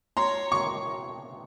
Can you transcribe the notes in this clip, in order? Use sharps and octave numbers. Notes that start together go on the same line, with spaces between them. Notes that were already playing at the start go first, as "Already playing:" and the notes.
C#5 A#5 C6
C#6